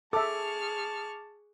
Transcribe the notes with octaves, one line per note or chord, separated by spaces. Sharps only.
G#4 A4 E5 A5 C#6 D6 F6